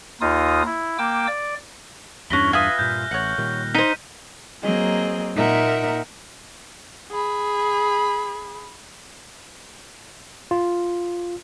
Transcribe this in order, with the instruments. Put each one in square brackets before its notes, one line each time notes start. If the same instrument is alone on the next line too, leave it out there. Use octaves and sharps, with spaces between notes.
[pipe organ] D#2 D#4 F4 D#6
E4
A#3 G5 D6 E6
D5
[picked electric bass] E2 G2 D4 [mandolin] C#4 E4 [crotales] F#6 A#6 G7
[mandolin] F4 B4 D#6 [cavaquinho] E5 G#5 [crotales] F6
[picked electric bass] G2 A#2 [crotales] G6
[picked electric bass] A1 [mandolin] C#5 F#5
[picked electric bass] A#2 D#3 G3
[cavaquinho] D#4 C5 [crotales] B6 D#7
[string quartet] F#3 A#3 C4 G#4 D#5
A#2 A#3 D#4 A#4 E5 F#5
[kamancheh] G#4 B5
[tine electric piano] F4